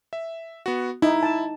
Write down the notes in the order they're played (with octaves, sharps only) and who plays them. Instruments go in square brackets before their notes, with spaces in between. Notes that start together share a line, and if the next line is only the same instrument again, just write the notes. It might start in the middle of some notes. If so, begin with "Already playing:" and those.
[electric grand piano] E5
B3 F#4
[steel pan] D#4 [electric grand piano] E4
[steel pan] A5